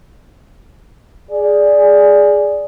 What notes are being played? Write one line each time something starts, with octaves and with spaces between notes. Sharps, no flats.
G#4 D5